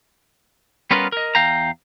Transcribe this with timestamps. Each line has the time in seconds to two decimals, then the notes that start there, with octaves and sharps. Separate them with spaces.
0.91 G3 B3 C#4 F4 A#4 B4
1.12 A#4 D#5
1.35 E2 F5 G5 A#5